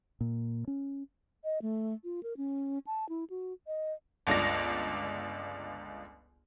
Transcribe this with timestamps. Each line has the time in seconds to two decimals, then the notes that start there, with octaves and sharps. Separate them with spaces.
0.21 A#2
0.67 C#4
1.44 D#5
1.62 A3
2.04 F4
2.23 A#4
2.37 C#4
2.87 A5
3.09 E4
3.30 F#4
3.67 D#5
4.27 G1 C#2 D4 A#6